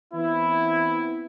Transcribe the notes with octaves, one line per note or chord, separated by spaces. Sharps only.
E3 B3 C4 E4